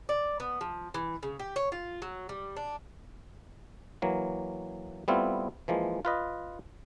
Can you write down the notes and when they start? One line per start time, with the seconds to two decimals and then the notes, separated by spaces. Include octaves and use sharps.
0.09 D5
0.40 B3
0.61 F3
0.94 E3
1.23 C#3
1.39 G4
1.56 C#5
1.72 F4
2.02 F#3
2.29 G3
2.57 D4
4.02 E3 F#3 A#3
5.08 G3 A3 B3 C4 E4 F4
5.68 E3 F3 G#3 A#3
6.05 F4 B4 D#5